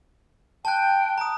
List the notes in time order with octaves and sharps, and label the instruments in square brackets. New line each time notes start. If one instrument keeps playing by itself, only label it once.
[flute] G5 [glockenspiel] A5 F#6
[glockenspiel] A#5 D#6